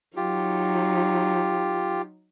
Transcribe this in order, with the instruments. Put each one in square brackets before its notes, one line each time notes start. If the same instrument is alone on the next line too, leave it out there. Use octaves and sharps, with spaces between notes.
[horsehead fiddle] F#3 D#4 [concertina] F4 G4